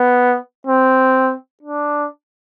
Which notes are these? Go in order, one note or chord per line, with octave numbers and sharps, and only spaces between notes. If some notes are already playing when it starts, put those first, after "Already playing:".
Already playing: B3
C4
D4